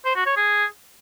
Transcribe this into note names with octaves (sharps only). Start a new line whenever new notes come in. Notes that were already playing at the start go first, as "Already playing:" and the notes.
C5
F#4
C#5
G#4